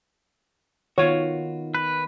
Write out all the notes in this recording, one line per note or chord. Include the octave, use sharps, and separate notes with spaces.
D#3 B3 F4 F#4 C#5
B4